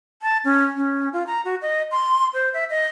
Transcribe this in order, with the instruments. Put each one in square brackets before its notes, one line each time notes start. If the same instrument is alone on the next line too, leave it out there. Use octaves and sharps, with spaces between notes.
[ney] A5
C#4
C#4
F4
A#5
F#4
D#5
C6
C5
E5
D#5